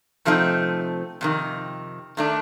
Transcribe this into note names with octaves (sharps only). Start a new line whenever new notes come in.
C3 F3 A3 C4 D#4
F2 C3 D#3
D#3 A3 D4